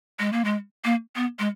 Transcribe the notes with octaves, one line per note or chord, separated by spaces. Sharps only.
G#3
A#3
G#3
A#3
B3
G#3